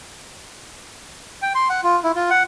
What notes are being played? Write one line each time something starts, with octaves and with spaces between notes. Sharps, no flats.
G5
C6
F#5
F4
E4
F4
F#5